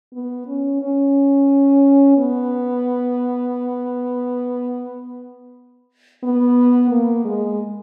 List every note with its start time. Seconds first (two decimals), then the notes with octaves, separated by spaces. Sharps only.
0.13 B3
0.47 C#4
0.81 C#4
2.17 B3
6.23 B3
6.91 A#3
7.24 G#3